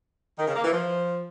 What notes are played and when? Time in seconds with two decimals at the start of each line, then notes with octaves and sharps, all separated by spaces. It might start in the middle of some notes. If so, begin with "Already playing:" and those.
0.39 D#3
0.47 C#3
0.55 A#3
0.64 E3
0.72 F3